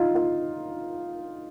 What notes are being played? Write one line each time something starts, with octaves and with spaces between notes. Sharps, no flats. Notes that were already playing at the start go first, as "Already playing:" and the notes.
Already playing: D#4 F4
F4